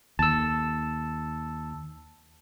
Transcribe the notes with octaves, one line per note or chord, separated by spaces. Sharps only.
D#2 A5 E6